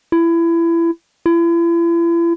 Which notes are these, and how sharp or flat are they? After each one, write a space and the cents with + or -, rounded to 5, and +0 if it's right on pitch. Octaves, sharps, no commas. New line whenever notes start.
E4 +25
E4 +40